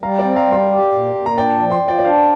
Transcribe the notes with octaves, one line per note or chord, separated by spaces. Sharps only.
G3 F5 A#5
D5 G5
C4
F5 A#5
G3
G5 C6
G4
A#2
A#2
A#5
D4 D5 G5
F3
G5 C6
F3
D5 G5
D5
D4 C5 F5